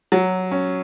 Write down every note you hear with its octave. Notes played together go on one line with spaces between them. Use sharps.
F#3
C#4